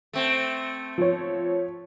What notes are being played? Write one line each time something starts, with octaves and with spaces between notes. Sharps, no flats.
A3 C4
F3 C#5